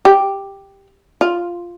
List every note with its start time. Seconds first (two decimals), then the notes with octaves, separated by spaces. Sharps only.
0.05 G4
1.21 F4